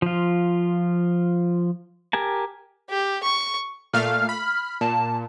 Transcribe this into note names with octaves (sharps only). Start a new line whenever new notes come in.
F3 F4
G4 A#4 G#5 A5
G4
C#6
A#2 A3 F5 F6
B5
A#2 A5